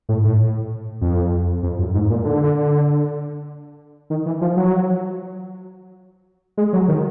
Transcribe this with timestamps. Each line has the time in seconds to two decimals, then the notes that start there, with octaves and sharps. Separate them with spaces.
0.09 A2
0.24 A2
1.01 F2
1.63 F2
1.79 F#2
1.94 G#2
2.10 A#2
2.25 D3
4.10 D#3
4.26 E3
4.41 F3
4.57 F#3
6.57 G#3
6.73 F#3
6.88 D#3